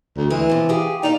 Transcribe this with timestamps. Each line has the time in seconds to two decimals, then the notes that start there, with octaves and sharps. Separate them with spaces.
0.17 D2
0.30 E3 G#3 G#4
0.50 C3 F3
0.69 F4 G4 G#4
1.03 D#4 D5 F5